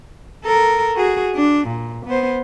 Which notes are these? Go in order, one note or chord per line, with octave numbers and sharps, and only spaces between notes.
A4 A#4
F#4 G#4
D4
A#2
B3 C5